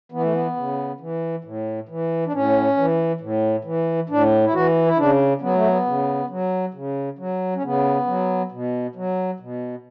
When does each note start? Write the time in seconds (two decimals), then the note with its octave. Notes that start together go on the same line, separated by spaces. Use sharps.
0.12 E3 B3
0.22 A3
0.32 B3
0.56 C#3
1.00 E3
1.44 A2
1.89 E3
2.26 D4
2.33 A2 C#4
2.77 E3
3.21 A2
3.65 E3
4.10 A2 D4
4.45 E4
4.54 E3 F#4
4.86 E4
4.97 C#3 D4
5.41 F#3 B3
5.54 A3
5.67 B3
5.86 C#3
6.30 F#3
6.74 C#3
7.19 F#3
7.55 C#4
7.63 C#3 B3
8.07 F#3
8.52 B2
8.96 F#3
9.40 B2